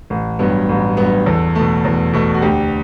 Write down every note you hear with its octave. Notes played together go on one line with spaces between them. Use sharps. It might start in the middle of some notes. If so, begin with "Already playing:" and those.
A1
G2 F#3 B3
A1
G2 F#3 B3
E2 A4
B2 A3
E2
B2 A3
F#4
D2 G4